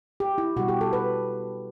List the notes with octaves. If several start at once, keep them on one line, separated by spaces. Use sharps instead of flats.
G4
E4
B2 G3 F#4
G4
A4
B4